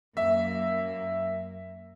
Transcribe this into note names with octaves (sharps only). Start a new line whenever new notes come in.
F#2 A#3 E5